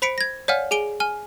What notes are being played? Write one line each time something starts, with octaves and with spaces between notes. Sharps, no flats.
C5 B5 B6 C#7 D7
G#6 A#6
C#5 D5 F5 F#5 G#5 F6
G#4 G#5 D7 G7
G#5 F6 G7